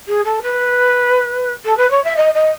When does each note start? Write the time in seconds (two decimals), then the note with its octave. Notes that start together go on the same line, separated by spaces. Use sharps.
0.08 G#4
0.25 A4
0.43 B4
1.65 A4
1.77 B4
1.91 C#5
2.04 E5
2.17 D#5
2.34 D#5